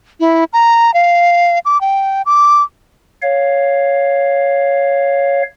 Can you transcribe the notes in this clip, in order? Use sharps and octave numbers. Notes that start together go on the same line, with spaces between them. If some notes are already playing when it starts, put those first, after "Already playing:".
E4
A#5
F5
D6
G5
D6
C#5 F5